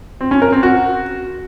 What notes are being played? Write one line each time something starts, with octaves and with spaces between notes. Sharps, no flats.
C4
C#4
A#4
C4
F#4